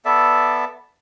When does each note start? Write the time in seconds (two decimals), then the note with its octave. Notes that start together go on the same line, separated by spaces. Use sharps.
0.05 B3 A4 D5 E5